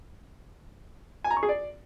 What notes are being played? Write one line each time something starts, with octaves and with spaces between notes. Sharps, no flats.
G#5
A#5
C#6
G#4
D5